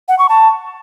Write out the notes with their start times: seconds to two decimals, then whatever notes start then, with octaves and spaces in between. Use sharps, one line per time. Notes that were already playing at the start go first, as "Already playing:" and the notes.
0.09 F#5
0.19 C#6
0.29 A5